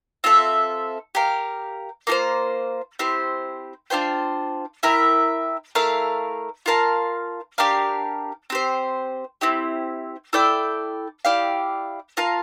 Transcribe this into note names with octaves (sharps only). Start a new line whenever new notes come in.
C4 F4 A4 E5
G4 A#4 F5
A#3 F4 A4 C5
C4 E4 G4 C5
D4 F4 C5 G5
E4 A#4 E5 G5
A3 E4 A#4 F5
F4 A#4 F5 A5
D4 G4 A#4 F5
C4 G4 C5
C4 E4 G4
E4 A4 D5 G5
E4 G4 D5 F5
F4 A#4 F5 A5